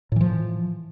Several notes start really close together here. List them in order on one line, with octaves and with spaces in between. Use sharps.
A2 E3 F3